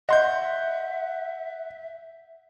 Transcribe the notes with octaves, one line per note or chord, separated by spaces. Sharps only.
D#5 E5 F#5 C6 G6